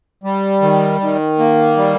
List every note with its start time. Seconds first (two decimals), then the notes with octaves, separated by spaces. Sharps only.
0.24 G3
0.62 D#3
1.01 D#3
1.39 A#3
1.77 G3